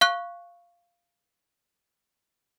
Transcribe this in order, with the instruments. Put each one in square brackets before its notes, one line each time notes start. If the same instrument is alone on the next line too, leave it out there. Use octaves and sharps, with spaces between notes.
[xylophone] F5 C#6 F#6